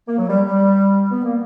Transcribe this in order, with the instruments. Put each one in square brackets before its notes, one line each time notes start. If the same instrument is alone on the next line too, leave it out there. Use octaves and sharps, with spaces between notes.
[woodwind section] A#3
F#3
G3
G3
B3
A#3